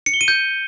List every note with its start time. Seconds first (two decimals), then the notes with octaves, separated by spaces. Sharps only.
0.06 C#7
0.14 G7
0.21 D#7
0.28 G6